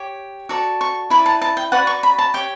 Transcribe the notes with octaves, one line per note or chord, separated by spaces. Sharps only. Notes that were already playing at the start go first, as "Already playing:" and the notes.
Already playing: G4 C#5
F#4 A4 D5
C#6
E4 B4 D5 B5
A5
A5
G5
F#4 B4 D5 F#5
C#6
B5
A5
G4 C#5 G5